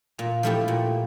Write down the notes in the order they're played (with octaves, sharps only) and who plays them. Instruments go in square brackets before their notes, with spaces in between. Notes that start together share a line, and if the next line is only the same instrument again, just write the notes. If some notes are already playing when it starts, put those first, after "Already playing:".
[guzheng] A#2 [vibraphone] F5
[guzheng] F3 A3 E4 G4
A#2